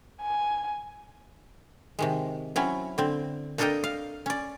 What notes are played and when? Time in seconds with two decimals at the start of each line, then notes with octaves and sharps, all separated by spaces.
0.22 G#5
1.99 C3 D#3 G#3
2.56 F#3 C4 C#4 E4
2.98 D3 C4
3.58 A#3 D4 A4 A#4 D#5 G5
3.84 F5
4.26 C#4 D5